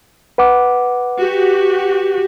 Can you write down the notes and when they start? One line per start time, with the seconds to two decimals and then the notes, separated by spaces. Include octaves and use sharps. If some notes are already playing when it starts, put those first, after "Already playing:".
0.38 B4 F#5 D6
1.19 F#4 G4